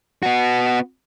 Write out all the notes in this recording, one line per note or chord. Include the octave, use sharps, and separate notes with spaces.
B3 F#4